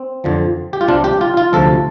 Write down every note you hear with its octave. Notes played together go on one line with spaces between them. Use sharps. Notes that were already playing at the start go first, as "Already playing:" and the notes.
Already playing: C4
F2 D3 F3
G4
F4
C2 C3 G3 D4
G4
F4
F4
D2 C3 F3 A4